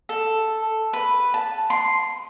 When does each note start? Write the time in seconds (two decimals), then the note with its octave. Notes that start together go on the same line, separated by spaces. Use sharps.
0.09 A4
0.93 B4
1.34 A5
1.70 C6